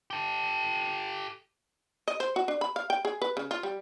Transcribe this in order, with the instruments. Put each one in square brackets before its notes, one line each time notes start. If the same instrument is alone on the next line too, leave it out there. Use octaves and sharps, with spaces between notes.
[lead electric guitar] G4 A4
[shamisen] D#5
C5
F#4
D4
B5
F5
G5
G#4
B4
C#3
F4
G3